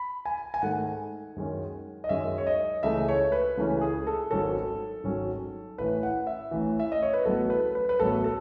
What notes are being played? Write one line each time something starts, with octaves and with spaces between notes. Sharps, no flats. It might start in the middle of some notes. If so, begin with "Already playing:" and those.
Already playing: B5
G#5
G#5
G#2 D#3 A3 F#5
F#2 D#3 G#3 C#4
D#5
F#2 D#3 G#3 C#4 E5
C#5
D#5
C#2 C#3 E3 A3 C#4 E5
C#5
B4
C#2 C#3 E3 A3 C#4
G#4
A4
G#1 G#2 D#3 F#3 C#4 A4
G#1 G#2 D#3 F#3 C#4
A1 A2 E3 B4
F#5
E5
A1 A2 E3
E5
D#5
C#5
B4
A1 A2 F#3 B3 A4
B4
B4
B4
A1 A2 F#3 B3 A4
A4